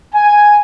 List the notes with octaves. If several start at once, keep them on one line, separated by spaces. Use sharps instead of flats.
G#5